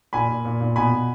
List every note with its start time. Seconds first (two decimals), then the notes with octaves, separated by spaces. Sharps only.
0.13 A#2 G#5 B5
0.29 A#2
0.45 A#2
0.60 A#2
0.76 B2 G#5 B5
0.92 B2